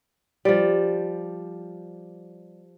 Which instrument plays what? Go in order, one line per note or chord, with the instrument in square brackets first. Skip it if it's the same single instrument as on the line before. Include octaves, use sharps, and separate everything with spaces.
[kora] F3 G3